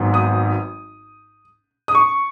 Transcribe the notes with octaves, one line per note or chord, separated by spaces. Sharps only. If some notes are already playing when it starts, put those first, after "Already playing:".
Already playing: G#1 G#2 F#3 B3
D#6
D#6
C#6